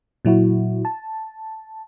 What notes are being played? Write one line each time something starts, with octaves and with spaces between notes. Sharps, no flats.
A#2 F#3 E4 F#4
A5